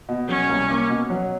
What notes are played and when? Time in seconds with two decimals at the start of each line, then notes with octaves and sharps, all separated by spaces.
0.09 B2
0.28 F#3 C#4
0.49 C2
0.69 A#3
0.90 B2
1.10 F#3